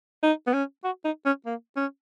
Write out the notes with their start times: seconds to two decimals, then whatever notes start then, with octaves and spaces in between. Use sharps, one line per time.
0.23 D#4
0.47 B3
0.54 C#4
0.84 F#4
1.05 D#4
1.26 C#4
1.46 A#3
1.77 C#4